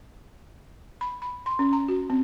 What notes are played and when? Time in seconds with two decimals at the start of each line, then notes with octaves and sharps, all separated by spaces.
1.01 B5
1.22 B5
1.46 C6
1.59 C#4
1.73 A#5
1.88 F#4
2.10 C4